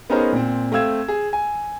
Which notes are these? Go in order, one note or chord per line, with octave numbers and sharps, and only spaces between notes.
B3 C#4 D#4 G#4 A#4 C5
A#2 C4
A3 C4 F5 E6 G#6 E7
G#4
G#5